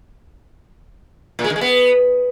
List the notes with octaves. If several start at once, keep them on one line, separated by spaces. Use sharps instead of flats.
A#2
G#3
D#3
G#3
B3